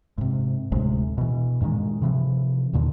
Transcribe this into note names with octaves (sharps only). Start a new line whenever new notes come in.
G#2 C3
D2 A2 C3 G#3
B2 E3
G2 A#2 D#3 G#3
C3 E3 F3
D#2 A#2 D3 D#3